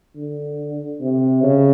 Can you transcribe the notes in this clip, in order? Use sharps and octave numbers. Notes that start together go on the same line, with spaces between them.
D3
C3
C#3